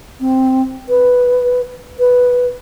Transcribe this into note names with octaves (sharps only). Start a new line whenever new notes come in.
C4
B4
B4